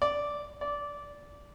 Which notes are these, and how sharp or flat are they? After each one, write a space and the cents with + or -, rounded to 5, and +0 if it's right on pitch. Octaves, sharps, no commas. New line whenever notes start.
D5 -5
D5 -15